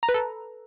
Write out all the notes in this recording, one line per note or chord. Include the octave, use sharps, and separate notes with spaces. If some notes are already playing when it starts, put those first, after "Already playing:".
A#5
B4
A4